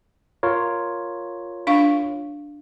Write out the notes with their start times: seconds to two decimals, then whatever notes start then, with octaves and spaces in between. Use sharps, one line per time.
0.43 F4 A#4 C#5
1.67 D4 F5 C#6